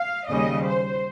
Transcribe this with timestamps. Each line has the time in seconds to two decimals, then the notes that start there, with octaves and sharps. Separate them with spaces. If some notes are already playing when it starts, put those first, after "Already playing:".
Already playing: F5
0.29 D#2 C#3 G3 D#5
0.65 C5